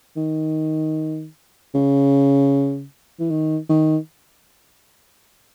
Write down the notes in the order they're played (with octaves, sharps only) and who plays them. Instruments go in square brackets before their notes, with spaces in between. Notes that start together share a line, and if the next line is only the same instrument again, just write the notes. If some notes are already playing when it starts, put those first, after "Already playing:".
[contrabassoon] D#3
C#3
E3
D#3
D#3